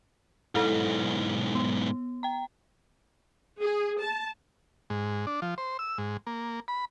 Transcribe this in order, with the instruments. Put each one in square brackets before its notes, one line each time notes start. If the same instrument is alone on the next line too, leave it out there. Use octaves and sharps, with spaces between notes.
[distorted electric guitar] B1 G#2 [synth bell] E4 A4
[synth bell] B3
G5 A#5
[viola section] G#4
A5
[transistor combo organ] G#2
D4
F3
C5
E6
G#2
A#3
B5